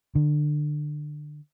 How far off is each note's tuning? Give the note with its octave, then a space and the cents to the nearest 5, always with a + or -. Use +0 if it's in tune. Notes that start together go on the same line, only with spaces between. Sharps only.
D3 +25